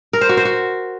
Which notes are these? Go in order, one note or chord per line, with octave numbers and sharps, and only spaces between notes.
A#4
C5
F#4
C5
F#4